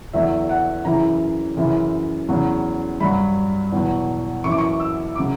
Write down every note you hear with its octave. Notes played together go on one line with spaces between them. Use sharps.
E2 D3 F#3 E5
F#5
F#2 C#3 E3 A#5
F#2 C#3 E3
E2 C#3 F#3
G2 F#3 B5
E2 B2 F#3
F#2 E3 C#6
D6
C#6
E6
C#3 F#3 D6